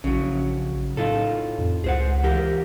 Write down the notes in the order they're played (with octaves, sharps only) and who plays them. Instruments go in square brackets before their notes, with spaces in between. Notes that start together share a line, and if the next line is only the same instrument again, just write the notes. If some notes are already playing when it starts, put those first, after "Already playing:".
[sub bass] A#1 [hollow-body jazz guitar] C#3 F#3
[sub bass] A2 [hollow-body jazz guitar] D#4 F4 A4
[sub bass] F2
[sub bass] C#2 [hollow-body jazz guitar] G#4 C5 F#5
[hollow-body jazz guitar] E3 G4 A#4